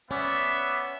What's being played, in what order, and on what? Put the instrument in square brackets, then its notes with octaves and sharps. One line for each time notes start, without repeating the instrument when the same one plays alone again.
[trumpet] B3 [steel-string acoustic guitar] C#4 [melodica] D5 [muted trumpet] E5